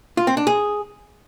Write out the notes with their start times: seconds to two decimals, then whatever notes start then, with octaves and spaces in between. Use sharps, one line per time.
0.17 F4
0.27 C4
0.37 D4
0.47 G#4